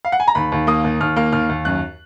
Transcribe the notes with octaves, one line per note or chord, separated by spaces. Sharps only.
F5
F#5
G#5
A#5
D#2 B5
D#2
A#3 D#6
D#2
D#2 F6
A#3 F6
D#2 F6
D#2
F#2 F#6